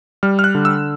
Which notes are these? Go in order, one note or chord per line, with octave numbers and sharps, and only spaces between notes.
G3 F6
F6
F#6
D3
E6